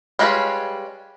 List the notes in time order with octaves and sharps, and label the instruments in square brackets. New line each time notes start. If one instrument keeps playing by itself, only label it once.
[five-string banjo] G3 G#3 C#4 F4 B4